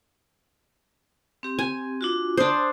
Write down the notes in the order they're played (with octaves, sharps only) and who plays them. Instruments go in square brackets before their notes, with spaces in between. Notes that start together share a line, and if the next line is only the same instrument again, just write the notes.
[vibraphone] C4 G4
[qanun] G#5
[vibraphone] D4 F4 F#4
[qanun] D4 C5 [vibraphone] C6 D#6